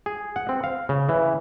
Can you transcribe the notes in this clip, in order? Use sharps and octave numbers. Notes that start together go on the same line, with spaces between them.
G#4
F#5
C4
F5
C#3
E3